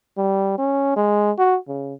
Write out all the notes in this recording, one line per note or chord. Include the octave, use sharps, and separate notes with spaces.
G3
C#4
G#3
F#4
C#3